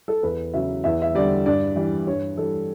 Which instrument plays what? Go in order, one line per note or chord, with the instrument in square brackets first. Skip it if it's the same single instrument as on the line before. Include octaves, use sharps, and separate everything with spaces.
[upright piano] A4
E2 B4
C#3 F#3 E5
E2 E5
E5
D3 G3 D5
G2 D5
E3 G3
G2 C#5
E3 G3 A4